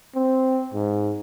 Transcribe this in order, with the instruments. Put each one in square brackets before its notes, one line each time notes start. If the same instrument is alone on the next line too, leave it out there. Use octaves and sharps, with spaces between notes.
[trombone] C4
G#2